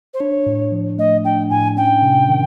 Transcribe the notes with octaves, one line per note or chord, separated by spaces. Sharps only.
C5
D4 C#5
A2
F3
A3 D#5
D4 G5
A2 G#5
C#4 G5
C3
D#3